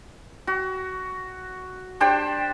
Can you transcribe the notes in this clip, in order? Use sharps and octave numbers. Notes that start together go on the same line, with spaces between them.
F#4
D4 G4 C5 G5